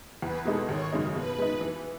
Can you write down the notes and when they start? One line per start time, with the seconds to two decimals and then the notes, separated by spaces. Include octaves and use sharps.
0.22 E2 B4
0.45 B2 G#3 D#4 A4
0.69 G#1 C#5
0.92 F#2 C#3 G#3 D#4
1.15 B2 B4
1.38 G#3 B3 D#4
1.61 E3